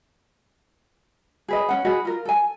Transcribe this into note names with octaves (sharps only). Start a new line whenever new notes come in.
G#4 B4 D#5
C#4 F#5
F#4 G#4 B4 D#5
F4 A#4
A4 G#5